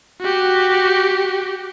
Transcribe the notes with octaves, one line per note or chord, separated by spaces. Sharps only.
F#4 G4